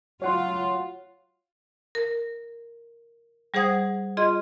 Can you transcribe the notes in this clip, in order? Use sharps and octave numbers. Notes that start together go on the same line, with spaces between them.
F#3 F4 C#5 F#5 C6
A#4
G3 G#4 C5 F#5 D#6 G#6
F4 G#4 D#5 C6